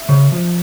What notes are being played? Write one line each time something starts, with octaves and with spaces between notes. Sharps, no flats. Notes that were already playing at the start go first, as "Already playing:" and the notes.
Already playing: E5
C#3
F3